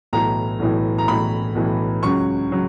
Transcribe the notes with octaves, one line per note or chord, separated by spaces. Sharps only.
B1 A2 E3 A#5
B1 A2 E3
A#5
B1 A2 E3 B5
B1 A2 E3
C#2 C#3 F#3 C#6
C#3 F#3